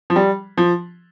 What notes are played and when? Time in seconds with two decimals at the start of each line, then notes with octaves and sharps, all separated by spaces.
0.10 F3
0.16 G3
0.58 F3